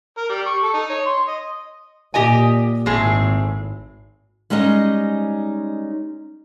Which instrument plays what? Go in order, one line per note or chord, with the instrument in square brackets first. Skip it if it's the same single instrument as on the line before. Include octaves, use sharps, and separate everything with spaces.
[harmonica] A#4
G3
C#6
A4
D#4
C#5
C6
D#5
[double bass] A#2 [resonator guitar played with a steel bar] G4 D#5 G#5
[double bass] G#1 [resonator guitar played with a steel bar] A2 C4 G#4
[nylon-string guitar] G3 G#3 C#4 D#4 D#5